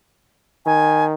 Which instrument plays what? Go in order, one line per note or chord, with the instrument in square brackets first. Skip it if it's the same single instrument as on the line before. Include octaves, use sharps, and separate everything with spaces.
[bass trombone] D#3 [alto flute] G#5